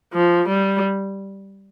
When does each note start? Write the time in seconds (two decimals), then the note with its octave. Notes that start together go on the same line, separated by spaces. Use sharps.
0.13 F3
0.49 G3